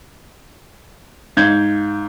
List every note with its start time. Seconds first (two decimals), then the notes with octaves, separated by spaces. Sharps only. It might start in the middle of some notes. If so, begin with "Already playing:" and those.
1.37 G#2 F5 G6 G#6